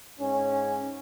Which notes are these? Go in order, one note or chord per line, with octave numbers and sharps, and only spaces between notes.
G#2 C#4